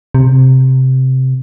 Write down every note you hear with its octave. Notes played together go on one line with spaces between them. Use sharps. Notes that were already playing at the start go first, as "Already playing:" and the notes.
C3